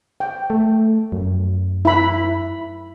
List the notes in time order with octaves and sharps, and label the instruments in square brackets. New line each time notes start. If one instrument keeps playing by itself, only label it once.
[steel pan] G5
[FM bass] A3
F#2
[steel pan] E4 B5